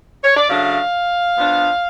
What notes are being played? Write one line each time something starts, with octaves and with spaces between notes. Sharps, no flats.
C#5
D5
C#3 F#3 A3 D4 F5
F3 B3 D4